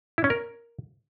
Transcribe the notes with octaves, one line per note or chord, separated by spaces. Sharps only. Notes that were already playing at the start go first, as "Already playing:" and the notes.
E4
C#4
A#4